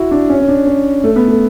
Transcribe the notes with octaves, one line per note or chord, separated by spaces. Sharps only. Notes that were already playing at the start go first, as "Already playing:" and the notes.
Already playing: E4 F#4
D4
C#4
C#4
D4
C#4
A3
B3
A3